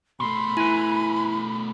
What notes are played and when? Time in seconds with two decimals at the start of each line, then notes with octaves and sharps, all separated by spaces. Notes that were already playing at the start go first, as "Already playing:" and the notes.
0.20 B2 A3 B5 C6
0.57 E4 B4 G#5